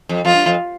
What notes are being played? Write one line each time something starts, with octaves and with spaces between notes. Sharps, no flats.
F2
F2 F4
G2
F2